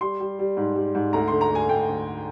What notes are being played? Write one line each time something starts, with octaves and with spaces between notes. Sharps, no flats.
G3 C6
G3
G3
G#2
G3
G#2
D2 A#5
D3 C6
A#5
D2 G#5
D2 G5
D2